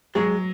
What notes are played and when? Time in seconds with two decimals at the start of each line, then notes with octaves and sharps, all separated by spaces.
0.15 F#3 G#3